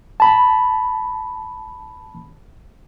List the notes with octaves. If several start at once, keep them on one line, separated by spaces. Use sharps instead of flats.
A5 B5